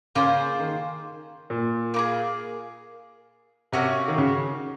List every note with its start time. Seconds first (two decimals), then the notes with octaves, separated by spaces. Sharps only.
0.15 C#3 A#3 F4 G#4 C5
0.60 D#3
1.50 A#2
1.94 A#3 D#4 G#4
3.72 C3 A#3 C#4 F#4 C#5
4.08 D#3
4.18 C#3